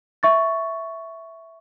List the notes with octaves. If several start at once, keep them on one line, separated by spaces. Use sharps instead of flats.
E5 C#6 A6